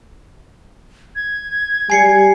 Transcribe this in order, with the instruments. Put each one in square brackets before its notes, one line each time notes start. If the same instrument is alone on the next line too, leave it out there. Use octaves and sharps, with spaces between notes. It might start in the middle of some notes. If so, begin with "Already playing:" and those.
[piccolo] G#6
[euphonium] G3 [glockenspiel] G#5 C7 C#7